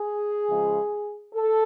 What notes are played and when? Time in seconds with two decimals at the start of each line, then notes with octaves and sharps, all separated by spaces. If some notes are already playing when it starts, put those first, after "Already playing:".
Already playing: G#4
0.47 C#3 F3 G#3
1.35 A4